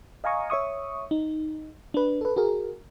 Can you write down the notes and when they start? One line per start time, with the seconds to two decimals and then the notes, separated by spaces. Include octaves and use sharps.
0.24 D#5 F5 G#5 A#5 C#6 D#6
0.50 C#5 E5 C#6 D#6
1.11 D#4
1.94 D4 B4
2.21 A4 B4
2.36 F#4 G#4 A#4